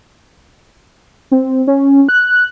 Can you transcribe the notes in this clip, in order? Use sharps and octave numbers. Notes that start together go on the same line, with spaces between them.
C4
C#4
F#6